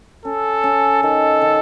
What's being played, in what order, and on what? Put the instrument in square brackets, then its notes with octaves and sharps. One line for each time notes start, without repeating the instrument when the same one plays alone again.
[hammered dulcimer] C#4 [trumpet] A4
[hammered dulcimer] C#4
[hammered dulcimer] D#3 [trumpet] A4
[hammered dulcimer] D#3